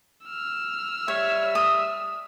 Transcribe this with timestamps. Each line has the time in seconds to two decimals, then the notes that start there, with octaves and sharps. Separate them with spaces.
0.25 E6 F6
1.08 G3 C#5 E5
1.55 D#6